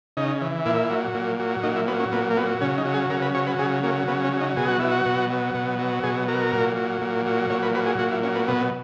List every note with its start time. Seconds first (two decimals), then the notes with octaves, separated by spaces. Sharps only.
0.17 C#3 D#4
0.41 E3
0.65 A#2 E4
0.90 F#3
1.14 A#2
1.39 F#3
1.63 A#2 D#4
1.76 E4
1.87 F#3 B3
2.00 C#4
2.12 A#2 B3
2.30 A#3
2.37 F#3 B3
2.61 C#3 C#4
2.78 D#4
2.85 F#3
2.94 G#4
3.10 C#3 A#4
3.22 B4
3.34 F#3 C#5
3.47 B4
3.59 C#3 G#4
3.83 F#3 A#3
4.08 C#3 B3
4.24 C#4
4.32 F#3
4.41 D#4
4.57 B2 G#4
4.68 F#4
4.79 F#3 E4
4.91 F#4
5.06 B2
5.30 F#3
5.54 B2
5.79 F#3
6.03 B2 G#4
6.28 F#3 A#4
6.53 A#2
6.76 F#3
7.02 A#2
7.26 F#3
7.50 A#2 C#5
7.62 B4
7.74 F#3 B4
7.86 G#4
7.99 A#2 F#4
8.11 E4
8.23 F#3 C#4
8.35 B3
8.48 B2 B3